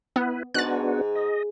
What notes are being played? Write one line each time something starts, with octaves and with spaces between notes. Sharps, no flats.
B3 E4 B4
G#2 B3 D4 F#4 F#6 A6
D#5